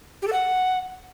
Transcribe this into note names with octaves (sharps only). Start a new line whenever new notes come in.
G4
A4
F#5